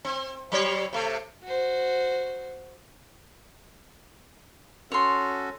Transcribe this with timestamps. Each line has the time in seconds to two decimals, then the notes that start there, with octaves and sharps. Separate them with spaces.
0.05 C4
0.52 F#3 G3 C#5
0.93 C3 A3
1.43 F#4 C5
4.92 C#4 F#4 A4 C#5 C6